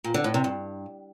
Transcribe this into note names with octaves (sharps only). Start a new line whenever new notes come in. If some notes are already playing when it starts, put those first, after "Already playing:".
A#2
D3
A2
C3
G2